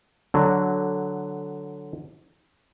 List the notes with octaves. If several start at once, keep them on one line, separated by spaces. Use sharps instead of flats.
D3 F#3